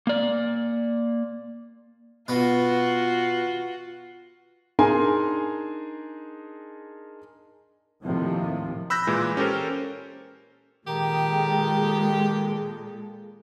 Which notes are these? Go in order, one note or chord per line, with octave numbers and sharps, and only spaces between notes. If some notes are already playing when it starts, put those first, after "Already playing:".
A#3 D5
B2 F4 F#4 B4
D4 D#4 G#4 A#4 G#5 C6
D#2 A2 C3 F3
B5 E6 F#6 G6 A#6
A#2 E3 G#3
C#4 G4 A4 A#4 C5
A#2 D#3 G#3 G4 A4